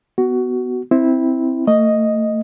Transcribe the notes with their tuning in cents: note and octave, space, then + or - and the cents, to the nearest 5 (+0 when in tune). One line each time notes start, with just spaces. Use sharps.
B3 +10 F#4 +15
C4 +0 E4 -10
A3 +35 D#5 +0